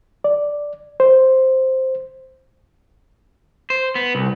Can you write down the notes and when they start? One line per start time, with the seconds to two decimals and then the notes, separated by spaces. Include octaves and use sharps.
0.24 D5
1.00 C5
3.70 C5
3.95 B3
4.15 C2